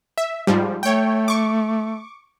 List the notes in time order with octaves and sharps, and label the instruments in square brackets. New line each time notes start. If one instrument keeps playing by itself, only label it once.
[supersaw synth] E5
G#2 F3 G3
[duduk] A3 [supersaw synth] C#5 G5
[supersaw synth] C#6 D6